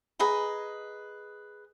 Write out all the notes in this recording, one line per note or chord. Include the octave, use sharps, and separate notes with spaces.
G#4 B4 D#5 A#5